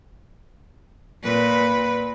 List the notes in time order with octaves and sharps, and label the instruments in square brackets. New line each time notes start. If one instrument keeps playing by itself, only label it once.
[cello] A#2 B4